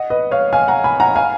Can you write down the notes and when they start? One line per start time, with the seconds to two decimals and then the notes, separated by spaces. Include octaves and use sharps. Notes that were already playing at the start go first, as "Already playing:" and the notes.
Already playing: D#5 F#5
0.10 B4 D#5
0.31 C#5 F5
0.53 F5 G#5
0.68 F#5 A#5
0.84 G#5 B5
1.00 F#5 A#5
1.16 F5 G#5